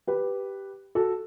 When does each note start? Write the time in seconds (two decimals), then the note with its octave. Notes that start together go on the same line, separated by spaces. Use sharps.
0.07 G4 B4
0.95 F#4 A4